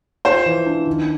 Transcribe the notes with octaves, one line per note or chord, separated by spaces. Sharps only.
F4 C5
E3
D4
D#3